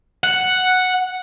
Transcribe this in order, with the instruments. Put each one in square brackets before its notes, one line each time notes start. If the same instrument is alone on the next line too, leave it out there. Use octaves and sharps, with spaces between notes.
[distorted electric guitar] F#5